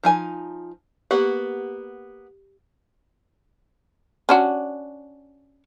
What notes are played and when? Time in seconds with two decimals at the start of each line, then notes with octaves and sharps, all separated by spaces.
0.03 F3 D#4 G#5
1.11 A#3 B3 G4 F#5
4.29 C#4 D4 F#4